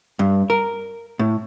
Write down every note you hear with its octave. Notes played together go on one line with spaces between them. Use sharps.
G2
A#4
A2